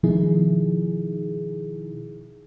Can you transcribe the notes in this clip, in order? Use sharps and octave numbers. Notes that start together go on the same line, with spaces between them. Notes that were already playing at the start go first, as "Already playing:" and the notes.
B2 D#3 F3 D#4 E4 G#4